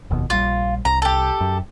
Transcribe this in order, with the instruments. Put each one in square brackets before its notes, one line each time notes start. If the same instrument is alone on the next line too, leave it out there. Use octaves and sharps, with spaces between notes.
[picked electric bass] F1 D#2 B2
[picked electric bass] A#1 G3 [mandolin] F4
[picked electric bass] C2 [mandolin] A#5
[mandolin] G4 A4
[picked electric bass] F#2